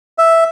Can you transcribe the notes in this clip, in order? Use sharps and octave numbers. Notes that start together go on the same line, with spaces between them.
E5